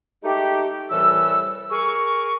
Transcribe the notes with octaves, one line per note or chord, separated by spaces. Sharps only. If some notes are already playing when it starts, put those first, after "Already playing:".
G#3 A3 D#4 G4
C2 A2 E3 G3 E6
G#4 A#4 C#6